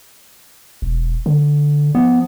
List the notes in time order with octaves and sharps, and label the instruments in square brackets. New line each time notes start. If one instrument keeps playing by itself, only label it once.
[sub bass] E1
D3
[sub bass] F3 [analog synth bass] B3